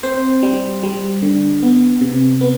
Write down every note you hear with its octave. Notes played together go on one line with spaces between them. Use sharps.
C4 C5
G3
G3
D3
B3
C3
B3